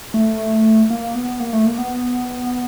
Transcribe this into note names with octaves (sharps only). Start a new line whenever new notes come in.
A3
A#3
B3
A#3
A3
A#3
B3